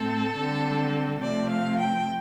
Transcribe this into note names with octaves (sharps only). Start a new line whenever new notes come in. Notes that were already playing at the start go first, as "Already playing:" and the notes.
Already playing: A2 A3 C4 A4
D3 G3 C4
C3 F3 A3 C4 D5
F5
G5